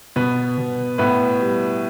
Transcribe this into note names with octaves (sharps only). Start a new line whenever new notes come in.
B2 B3 B4
B2
A2 B3 B4
G3